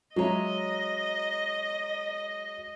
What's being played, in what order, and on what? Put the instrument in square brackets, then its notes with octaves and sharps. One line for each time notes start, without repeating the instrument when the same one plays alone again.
[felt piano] F#3 A#5 [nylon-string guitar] G#3 C#5 E5 [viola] D#5